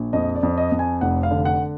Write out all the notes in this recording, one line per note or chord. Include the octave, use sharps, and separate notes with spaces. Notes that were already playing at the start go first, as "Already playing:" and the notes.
Already playing: A#1
F2 D#5
D5
F2
D#5
F2
G#5
F1 F#5
F5
D3
F#5